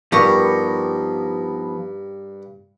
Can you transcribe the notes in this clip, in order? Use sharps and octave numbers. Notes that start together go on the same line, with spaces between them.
G2 F3 B3 D#4 G4 A#4 C#6